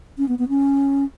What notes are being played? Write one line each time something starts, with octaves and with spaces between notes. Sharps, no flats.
C#4
B3
B3
C#4